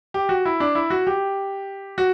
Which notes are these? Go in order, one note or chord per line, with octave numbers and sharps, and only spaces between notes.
G4
F#4
E4
D4
E4
F#4
G4
F#4